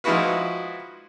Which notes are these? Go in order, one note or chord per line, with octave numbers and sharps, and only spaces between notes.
F3 G#3 D#4 E4 F#4 B4